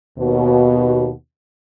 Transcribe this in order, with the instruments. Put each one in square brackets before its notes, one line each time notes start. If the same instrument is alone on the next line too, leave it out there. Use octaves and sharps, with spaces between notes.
[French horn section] D#2 B2